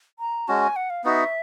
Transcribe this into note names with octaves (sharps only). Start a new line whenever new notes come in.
A#5
G#3 C#4 F#4 A5
G#5
F#5
F5
B3 D#4 F#4 E5 F5